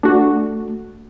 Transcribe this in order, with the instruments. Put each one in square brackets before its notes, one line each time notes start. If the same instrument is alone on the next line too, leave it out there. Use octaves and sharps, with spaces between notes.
[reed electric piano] A3 [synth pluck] D4 F#4